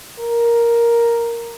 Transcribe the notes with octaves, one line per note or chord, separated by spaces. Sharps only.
A#4